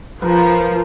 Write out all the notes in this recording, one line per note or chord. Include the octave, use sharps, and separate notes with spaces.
F3 A#4 B4